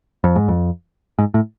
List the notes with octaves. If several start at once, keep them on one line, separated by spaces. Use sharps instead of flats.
F2
G#2
F2
G#2
A2